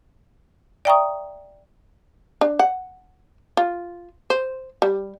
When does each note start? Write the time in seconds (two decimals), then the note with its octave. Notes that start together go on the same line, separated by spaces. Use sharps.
0.85 D5 E5 G5 A#5 C#6 D#6
2.41 D4
2.59 F#5
3.57 F4
4.30 C5
4.82 G3